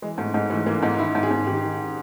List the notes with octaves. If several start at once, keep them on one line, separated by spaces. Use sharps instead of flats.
E3 G#3
G#2 A3
G#2 G#3
E3 A3
E3 A#3
G#2 D#4
D#3 E4
G#2
G#4
G#2
D#3 G4
D#3